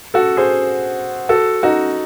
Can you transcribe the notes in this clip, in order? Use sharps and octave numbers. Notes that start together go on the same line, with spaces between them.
F#4 A4
G#4 C5
F#4 A4
D#4 F#4